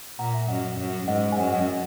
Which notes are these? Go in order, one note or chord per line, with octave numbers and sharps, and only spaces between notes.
A#2 F#5 A#5
E5 G#5
F#2 D#5 F#5
F#2
G#2 D#5 F#5
G#5
F#2 D#5 F#5
D#5 F#5
D#5